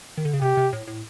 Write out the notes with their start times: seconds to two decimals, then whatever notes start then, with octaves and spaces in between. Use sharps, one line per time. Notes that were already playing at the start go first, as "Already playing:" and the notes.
0.17 D#3
0.25 D3
0.33 C#3
0.42 C3 G4
0.57 C3
0.73 A2
0.87 A2